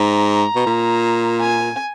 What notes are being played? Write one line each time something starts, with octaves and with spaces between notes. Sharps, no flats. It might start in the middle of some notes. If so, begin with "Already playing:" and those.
Already playing: G#2 A#5
B2
A#2
G#5